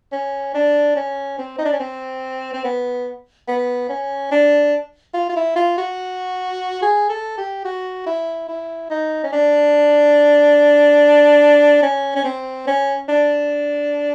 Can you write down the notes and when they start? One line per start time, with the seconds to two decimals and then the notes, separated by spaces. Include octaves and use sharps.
0.12 C#4
0.54 D4
0.96 C#4
1.38 C4
1.58 D#4
1.65 D4
1.73 C#4
1.80 C4
2.53 C4
2.64 B3
3.48 B3
3.89 C#4
4.31 D4
5.14 F4
5.29 F4
5.36 E4
5.56 F4
5.78 F#4
6.82 G#4
7.09 A4
7.38 G4
7.65 F#4
8.06 E4
8.48 E4
8.90 D#4
9.24 C#4
9.33 D4
11.83 C#4
12.16 C#4
12.24 C4
12.67 C#4
13.09 D4